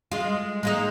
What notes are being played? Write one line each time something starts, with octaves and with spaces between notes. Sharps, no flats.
G#3 F4
G#3 A#3 D#4